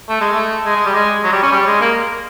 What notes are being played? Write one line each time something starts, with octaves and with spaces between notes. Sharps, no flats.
A3
G#3
A3
G#3
G#3
G3
G#3
F#3
G3
C#4
G3
G#3
A#3